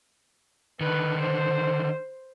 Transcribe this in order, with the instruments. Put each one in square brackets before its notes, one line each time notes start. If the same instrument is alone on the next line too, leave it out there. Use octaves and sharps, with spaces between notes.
[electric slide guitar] D3 D#3 [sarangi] B4
[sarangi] C5